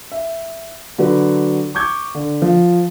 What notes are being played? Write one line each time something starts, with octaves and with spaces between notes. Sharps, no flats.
E5
D3 F#3 F#4 B4
C#6 D6 G6 G#6
D3
F3